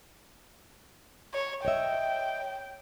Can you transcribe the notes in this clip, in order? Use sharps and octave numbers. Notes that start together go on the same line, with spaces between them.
C#5
C#5 D#5 E5 G5